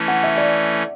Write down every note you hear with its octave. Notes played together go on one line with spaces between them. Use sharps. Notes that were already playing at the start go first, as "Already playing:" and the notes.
Already playing: E3 A3 C#4
F#5
E5
D5